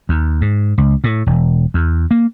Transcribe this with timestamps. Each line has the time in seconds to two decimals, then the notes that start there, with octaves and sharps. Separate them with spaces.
0.09 D#2
0.41 G#2
0.78 C#2
1.04 A2
1.26 E1
1.74 E2
2.11 A#3